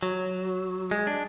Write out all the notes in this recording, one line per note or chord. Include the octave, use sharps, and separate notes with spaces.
F#3
G#3
D4